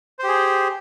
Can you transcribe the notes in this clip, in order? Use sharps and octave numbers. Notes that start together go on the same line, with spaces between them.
G4 G#4 C5